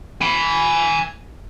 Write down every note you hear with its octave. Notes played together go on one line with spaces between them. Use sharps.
G#5 B5